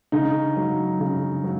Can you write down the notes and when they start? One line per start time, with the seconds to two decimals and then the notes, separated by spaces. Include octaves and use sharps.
0.12 C#3 D#4
0.57 F#3
1.00 C#3
1.44 F#3